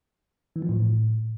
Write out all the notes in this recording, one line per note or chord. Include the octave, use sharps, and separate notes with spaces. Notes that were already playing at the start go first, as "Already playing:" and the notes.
E3
F3
A2